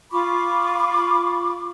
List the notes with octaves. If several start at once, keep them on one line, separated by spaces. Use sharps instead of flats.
F4 B5 C#6 D6